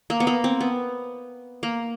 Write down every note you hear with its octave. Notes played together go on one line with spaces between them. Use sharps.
A#3
B3
A#3
C4
B3
A#3